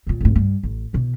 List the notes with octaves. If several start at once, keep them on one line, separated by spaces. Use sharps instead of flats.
D#2 A#2
F2 A2
G2
A1
B2 E3